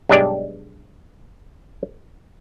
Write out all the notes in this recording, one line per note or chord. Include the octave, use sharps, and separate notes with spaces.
B1 G2 G#3 D4 G4 D5